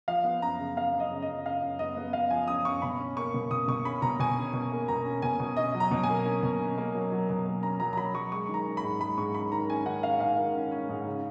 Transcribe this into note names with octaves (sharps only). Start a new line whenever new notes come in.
F3 F5
B3
F#2 A#5
C#3
B3 F5
F#2
D#5
C#3
D#5
F#2
C#3 F5
F#2
B3 D#5
B3
B3 F5
F3 G#5
F#2 D#6
F#2 C#6
B2 B5
C#4
A#3 C#6
B2
B2 D#6
B2 C#6
C#4 B5
B2 A#5
B2 G#5
C#4
B2
A#3
B2 A#5
C#4
B2 G#5
B2
C#4 D#5
F#3
A#5
B2
G#5
A#3
C#4
B2
C#4
A#3
F#3
F#3
B2
A#3
C#4 A#5
F#3 A#5
A#5
F#3 B5
F#3 C#6
G#3 C#6
D#3
A#5
C#4
B5
G#2
G#3 B5
G#2 C#6
C#4 B5
D#3 A#5
C#4 G#5
D#3 F#5
C#4 F5
G#2 F5
D#3
C#4
C#4
G#2
C#3